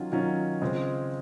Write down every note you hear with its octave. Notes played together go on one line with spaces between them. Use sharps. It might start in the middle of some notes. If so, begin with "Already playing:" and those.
Already playing: D#3 F#3 C#4 F4
D#3 F#3 C#4 F4
C#3 G#3 C4 F4